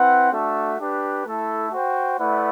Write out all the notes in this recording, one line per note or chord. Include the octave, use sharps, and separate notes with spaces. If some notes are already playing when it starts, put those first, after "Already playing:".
Already playing: C4 E4 B4 F#5
A3 D4 F#4 A4 E5
D4 G4 B4
A3 E4 A4 E5
F#4 C5 G5
A3 E4 B4 D5 F#5